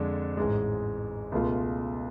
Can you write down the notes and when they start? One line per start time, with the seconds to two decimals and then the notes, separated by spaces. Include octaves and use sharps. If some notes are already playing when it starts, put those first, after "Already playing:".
Already playing: F2 D3 G#3 D4
0.37 A1 G#2 G#3
1.32 C#2 B2 A3 F4